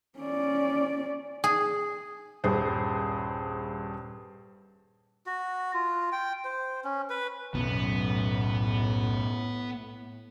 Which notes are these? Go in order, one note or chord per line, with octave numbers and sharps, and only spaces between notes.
C#4 D5
G#4
D#1 G2 G#4 C5
F#4
F4
G5
C5
C#4
B4
B1 F#2 A2 B3